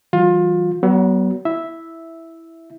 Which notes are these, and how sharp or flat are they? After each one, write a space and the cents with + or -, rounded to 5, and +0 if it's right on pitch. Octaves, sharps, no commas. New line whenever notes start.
E3 +0 G3 -40 F4 +25
F#3 +35 B3 -10
E4 +0 E5 -5